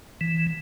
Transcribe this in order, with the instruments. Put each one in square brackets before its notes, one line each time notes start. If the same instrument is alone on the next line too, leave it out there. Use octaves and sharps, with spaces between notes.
[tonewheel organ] E3